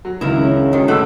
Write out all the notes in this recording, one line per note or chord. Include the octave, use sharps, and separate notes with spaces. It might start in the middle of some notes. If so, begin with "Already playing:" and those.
F#3
C#2 D#3 E4 A#4
C#4 D4 G#4 C#5
G#1 D#3
D3 G3 A3 G4 A4 F#5 E6 F#6